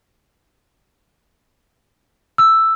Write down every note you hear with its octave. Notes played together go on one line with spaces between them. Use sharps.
E6